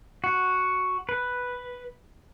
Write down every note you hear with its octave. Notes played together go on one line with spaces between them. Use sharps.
F#4
B4